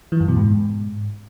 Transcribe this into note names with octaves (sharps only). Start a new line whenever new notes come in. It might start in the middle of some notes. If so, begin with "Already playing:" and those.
E3
F#2
B2
G#2